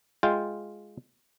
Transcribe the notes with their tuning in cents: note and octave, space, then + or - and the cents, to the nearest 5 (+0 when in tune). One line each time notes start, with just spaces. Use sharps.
G#3 +0 F4 +0 G5 +0